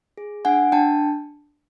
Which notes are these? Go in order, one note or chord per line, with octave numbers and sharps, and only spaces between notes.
G#4
D4 F#5 G#5
D4 G5 A5